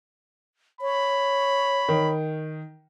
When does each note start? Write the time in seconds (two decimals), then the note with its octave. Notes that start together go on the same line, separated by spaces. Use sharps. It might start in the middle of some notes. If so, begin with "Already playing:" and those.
0.81 C#5 B5
1.89 D#3